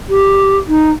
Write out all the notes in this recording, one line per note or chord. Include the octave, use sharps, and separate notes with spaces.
G4
D#4